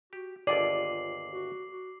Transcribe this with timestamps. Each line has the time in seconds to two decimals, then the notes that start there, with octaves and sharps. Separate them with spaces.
0.13 F#4 G4
0.47 G1 D#2 F4 G#4 D5 D6 C7 F#7
1.32 F#4
1.70 F#4